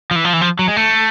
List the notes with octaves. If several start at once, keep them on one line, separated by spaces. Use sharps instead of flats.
F3
E3
F3
E3
F3
F#3
G#3
A3